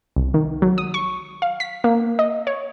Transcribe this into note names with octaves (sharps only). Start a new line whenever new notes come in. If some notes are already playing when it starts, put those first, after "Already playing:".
C2
D#3
F#3
D#6
C#6
F5
B6
A#3
D#5
C#5